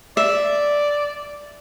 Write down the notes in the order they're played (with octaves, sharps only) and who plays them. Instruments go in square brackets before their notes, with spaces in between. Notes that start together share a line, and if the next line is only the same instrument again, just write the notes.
[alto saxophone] D5 [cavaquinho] E5